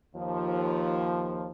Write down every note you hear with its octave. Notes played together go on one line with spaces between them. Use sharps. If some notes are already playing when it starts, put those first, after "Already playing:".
D#2 F3